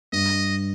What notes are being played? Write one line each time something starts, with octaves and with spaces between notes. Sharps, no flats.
G2 D#5